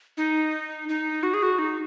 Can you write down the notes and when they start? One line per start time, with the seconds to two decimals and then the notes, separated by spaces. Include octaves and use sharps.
0.17 D#4
0.89 D#4
1.23 F#4
1.34 G#4
1.43 F#4
1.59 D#4